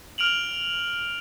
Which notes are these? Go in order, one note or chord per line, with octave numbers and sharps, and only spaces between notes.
F6 D7 F7 F#7